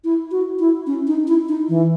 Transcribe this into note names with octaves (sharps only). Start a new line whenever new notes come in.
E4
F#4
E4
C#4
D#4
E4
D#4
E3